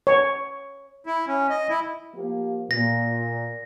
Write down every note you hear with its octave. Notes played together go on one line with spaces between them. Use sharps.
C#5
E4
C#4
D#5
E4
F3 A#3 G4
A#2 A#6